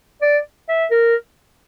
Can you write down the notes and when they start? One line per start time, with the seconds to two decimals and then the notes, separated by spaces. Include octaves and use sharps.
0.22 D5
0.69 E5
0.91 A#4